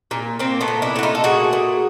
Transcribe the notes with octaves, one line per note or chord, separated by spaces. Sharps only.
A#2
A#2 A#3 C4
A3 B3
A#2
D4 E4
A3 F#4
D#4 F4
A4
A#2 F#4 G#4
A#2